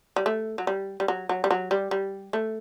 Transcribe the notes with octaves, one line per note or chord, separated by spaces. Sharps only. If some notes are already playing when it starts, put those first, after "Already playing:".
G3
A3
F#3
G3
G3
F#3
F#3
G3
F#3
G3
G3
A3